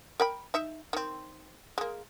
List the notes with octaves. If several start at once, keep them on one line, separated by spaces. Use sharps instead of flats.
A#4 G5 B5
D#4 E5
D#3 C4
G#3 A#3